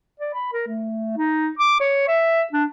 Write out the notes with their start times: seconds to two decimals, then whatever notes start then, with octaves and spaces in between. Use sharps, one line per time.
0.20 D5
0.34 B5
0.53 A#4
0.68 A3
1.17 D#4
1.59 D6
1.80 C#5
2.08 E5
2.53 D4